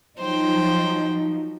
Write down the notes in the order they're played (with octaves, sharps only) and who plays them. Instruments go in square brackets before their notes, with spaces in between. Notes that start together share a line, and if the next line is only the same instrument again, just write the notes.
[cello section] F3 F#3 D#4 [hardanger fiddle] C5 G5